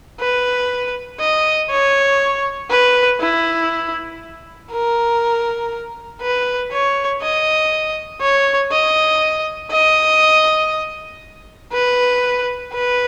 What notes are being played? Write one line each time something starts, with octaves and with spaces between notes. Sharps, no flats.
B4
D#5
C#5
B4
E4
A#4
B4
C#5
D#5
C#5
D#5
D#5
B4
B4